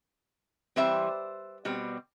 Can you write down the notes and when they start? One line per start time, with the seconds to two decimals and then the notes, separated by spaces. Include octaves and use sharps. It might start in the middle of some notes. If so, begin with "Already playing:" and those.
0.76 E3 G3 C4 C5 E5
1.65 B2 G3 C4